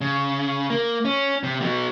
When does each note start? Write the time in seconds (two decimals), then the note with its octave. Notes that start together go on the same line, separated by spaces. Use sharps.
0.01 C#3
0.70 A#3
1.05 C#4
1.43 C3
1.61 B2 F#3